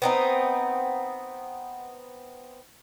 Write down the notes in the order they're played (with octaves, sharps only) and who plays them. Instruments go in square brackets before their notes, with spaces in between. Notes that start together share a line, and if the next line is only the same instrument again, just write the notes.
[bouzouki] B3 C4 D#4